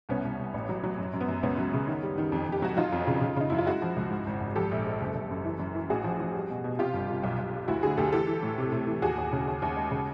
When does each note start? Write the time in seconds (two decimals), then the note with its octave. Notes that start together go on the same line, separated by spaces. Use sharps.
0.09 C2 B3 C#4
0.24 C2
0.39 C2
0.54 A1
0.69 F#3
0.84 F#3
0.98 F#2
1.14 F#2
1.20 B3
1.29 F#2
1.43 C#2 B3 C#4
1.58 F#3
1.74 C#3
1.88 D#3
2.03 G3
2.18 D#3
2.32 F2
2.47 F2
2.52 G4
2.62 F#3 F#4
2.77 F#3 D#4 F4
2.92 F2
3.07 C#3
3.21 C#3
3.36 C#3 D#4
3.50 F#2 E4
3.58 F4
3.66 G#3 E4 F#4
3.82 F3
3.96 C#2
4.11 G#2
4.27 G#1
4.41 G#1
4.56 F3 G4 A4
4.71 A#1
4.86 G#3
5.01 F#1
5.16 F#1
5.31 F#2
5.45 E3
5.60 F#2
5.75 E3
5.90 A1 F#4 G#4
6.04 F3
6.20 F3
6.34 G3
6.49 B2
6.64 B2
6.79 C3 F4 G4
6.94 G1
7.09 C3
7.23 B1
7.39 B1
7.54 G3
7.68 D2 E4 F#4
7.83 D3 F#4 G#4
7.97 D2 G4 A4
8.13 E3 G4 A4
8.27 E3
8.43 A2
8.58 C3
8.72 C3
8.87 E3
9.02 D#2 F#4 G#4
9.18 D#2
9.32 C#3
9.47 D#2
9.62 D#2
9.76 G#3
9.91 C#3